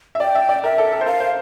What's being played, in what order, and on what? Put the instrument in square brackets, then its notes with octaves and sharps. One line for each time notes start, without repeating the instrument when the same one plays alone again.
[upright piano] E5
[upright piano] D5 [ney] G5
[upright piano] E5
D5
[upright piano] A#4 [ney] E5
[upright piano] A4
A4
C5
[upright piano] A#4 [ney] F5
[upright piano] C5